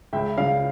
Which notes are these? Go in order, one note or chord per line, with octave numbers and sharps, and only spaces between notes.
C#2 E5 G5
C#3 D5 F5